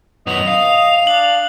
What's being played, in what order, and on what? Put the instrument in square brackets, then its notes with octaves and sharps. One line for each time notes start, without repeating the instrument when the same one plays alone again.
[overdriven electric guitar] F#2 B3 [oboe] D#5 [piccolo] F7
[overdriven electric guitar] F5
[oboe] D4 [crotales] F#7